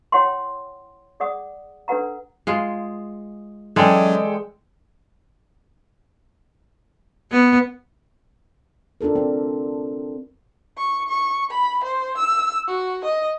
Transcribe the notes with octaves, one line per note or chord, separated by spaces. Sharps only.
E4 C#5 F#5 G5 C6
G#4 D5 F#5 D#6
D4 A4 B4 F#5 A#5
G#3 F4
E3 F#3 G#3 C#4 A4 D5 G5
B3
D4 F4 A4 A#4
C4
C#6
C#6
B5
C5
E6
F#4
D#5